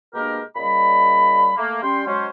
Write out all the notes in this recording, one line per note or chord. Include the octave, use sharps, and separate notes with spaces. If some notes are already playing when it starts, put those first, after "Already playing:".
B2 G#3 A#3 D4 G4 A#4
A#2 C#3 G3 D#5 B5
A3 A#3
G3 C#4 G5 C6
F#3 G#3 C#4 C5